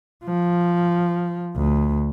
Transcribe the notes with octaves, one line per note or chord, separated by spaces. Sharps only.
F3
D2